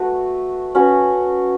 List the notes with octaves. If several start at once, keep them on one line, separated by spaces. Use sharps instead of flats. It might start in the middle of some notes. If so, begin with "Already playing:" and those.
Already playing: A3 F#4 B4
C#4 F#4 B4 E5